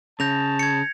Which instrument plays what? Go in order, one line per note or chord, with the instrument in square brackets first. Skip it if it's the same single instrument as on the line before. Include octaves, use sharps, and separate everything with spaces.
[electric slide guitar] C#3 [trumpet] A5 [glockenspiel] G6 A#6 F7
[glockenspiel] G#6 C#7